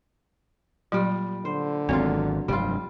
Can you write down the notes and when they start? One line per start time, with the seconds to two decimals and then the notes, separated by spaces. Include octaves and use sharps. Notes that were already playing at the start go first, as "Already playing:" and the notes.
0.92 A#2 F#3 G3
1.45 D3 C5
1.89 G#1 E2 F#3 C4 F4
2.48 F1 G2 F#3 G3 F4